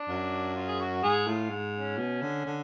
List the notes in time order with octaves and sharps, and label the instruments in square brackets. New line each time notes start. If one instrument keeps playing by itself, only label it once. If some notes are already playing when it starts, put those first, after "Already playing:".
Already playing: [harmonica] D4
[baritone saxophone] F#2
[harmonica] F4
G#4
F#4
[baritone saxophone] G#2 [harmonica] G#4
[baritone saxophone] A2 [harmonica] F4
[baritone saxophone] G#2
[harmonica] C#4
[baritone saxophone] B2
D3
D3